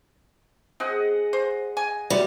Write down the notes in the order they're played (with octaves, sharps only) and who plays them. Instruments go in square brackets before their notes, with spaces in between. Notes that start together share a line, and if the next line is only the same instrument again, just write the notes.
[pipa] C4 [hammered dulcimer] G#4 D#5 F#5
[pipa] C5
G#5
[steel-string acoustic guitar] G3 [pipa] B3 [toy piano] F#4 E5